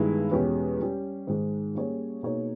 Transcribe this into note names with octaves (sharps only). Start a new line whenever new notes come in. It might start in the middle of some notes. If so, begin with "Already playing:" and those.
Already playing: G2 D#3 G#3 B3 E4
E2 B2 G#3 C#4 G4
G3 C#4 G4
G#2 D#3 G#3
G3 A#3 C#4 G#4 C#5
B2 A#3 D#4 G#4 C#5